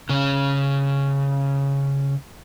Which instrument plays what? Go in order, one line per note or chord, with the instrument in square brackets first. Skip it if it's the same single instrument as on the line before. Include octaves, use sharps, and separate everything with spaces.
[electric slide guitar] C#3 C#4